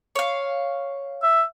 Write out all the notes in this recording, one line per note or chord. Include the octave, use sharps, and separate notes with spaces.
C#5 F5
E5